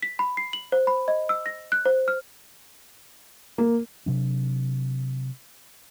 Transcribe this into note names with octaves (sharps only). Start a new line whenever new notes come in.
B6
B5
C7
F#7
C5
B5
D#5
E6
A#6
F#6
C5
F6
A#3
C3 F#3 D4